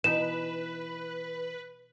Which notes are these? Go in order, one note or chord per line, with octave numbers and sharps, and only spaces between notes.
B2 E3 D#4 B4 E7